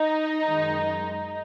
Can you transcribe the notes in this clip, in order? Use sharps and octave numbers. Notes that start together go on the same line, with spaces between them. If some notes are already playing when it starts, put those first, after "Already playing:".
Already playing: D#4
F#2 D#3 G#3